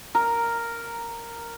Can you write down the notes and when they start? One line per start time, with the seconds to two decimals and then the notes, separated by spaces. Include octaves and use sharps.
0.15 A#4